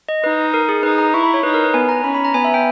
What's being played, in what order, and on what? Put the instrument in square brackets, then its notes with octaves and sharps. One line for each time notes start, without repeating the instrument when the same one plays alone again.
[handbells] D#5
[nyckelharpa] D#4 [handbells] B4
[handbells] A#4
G#4
[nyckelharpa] D#4 [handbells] B4
[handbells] A#5
[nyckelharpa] E4 [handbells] C#6
[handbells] B5
C#5
[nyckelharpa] D#4 [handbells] B4
[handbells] A#4
B4
[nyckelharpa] B3 [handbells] G#5
[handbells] A#5
[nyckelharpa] C#4 [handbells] B5
[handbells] B5
A#5
[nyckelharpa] B3 [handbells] G#5
[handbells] E5
G5